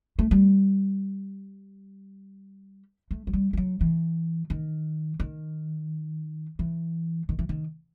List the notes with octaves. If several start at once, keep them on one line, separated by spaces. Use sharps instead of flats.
A3
G3
A3
F#3
G3
G3
F#3
E3
D#3
D#3
E3
D#3
E3
D#3